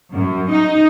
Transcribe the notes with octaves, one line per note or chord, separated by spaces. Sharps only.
F#2
D#4